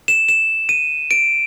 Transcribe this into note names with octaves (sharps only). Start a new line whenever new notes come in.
E7
E7
D#7
D7